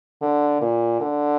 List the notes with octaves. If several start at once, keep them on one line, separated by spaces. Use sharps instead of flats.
D3
A#2
D3